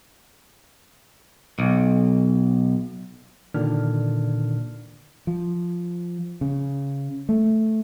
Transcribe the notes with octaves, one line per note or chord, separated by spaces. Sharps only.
B1
A#2 D3 D#3 D4 F6
F3
C#3
A3